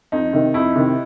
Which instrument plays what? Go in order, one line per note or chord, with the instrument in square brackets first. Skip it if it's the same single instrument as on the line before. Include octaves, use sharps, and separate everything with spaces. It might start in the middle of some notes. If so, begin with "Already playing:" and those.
[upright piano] F2 [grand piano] D#4
[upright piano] C3 D#3
[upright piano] F2 [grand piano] E4
[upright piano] C3 D#3